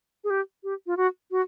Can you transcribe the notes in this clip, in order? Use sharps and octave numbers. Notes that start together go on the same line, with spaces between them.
G#4
G4
G4
F4
F#4
F#4